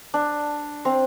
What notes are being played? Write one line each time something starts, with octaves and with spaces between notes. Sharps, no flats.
D4
C4